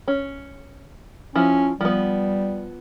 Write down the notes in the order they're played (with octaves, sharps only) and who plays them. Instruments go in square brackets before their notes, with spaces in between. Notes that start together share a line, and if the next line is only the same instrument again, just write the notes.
[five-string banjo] C#4
[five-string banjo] F3 E4 [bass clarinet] C#4
[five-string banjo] F3 B3 [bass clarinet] G3